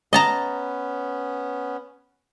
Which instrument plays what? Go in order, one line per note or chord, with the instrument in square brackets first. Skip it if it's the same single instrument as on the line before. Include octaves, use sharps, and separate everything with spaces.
[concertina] B3 C#4 [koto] D#5 A5 A#5